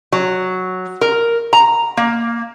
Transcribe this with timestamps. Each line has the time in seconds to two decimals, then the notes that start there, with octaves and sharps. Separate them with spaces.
0.12 F#3
1.01 A#4
1.53 A#5
1.97 A#3